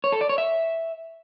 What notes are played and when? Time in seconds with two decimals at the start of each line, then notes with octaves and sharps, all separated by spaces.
0.04 C#5
0.12 A4
0.21 D5
0.29 C#5
0.38 E5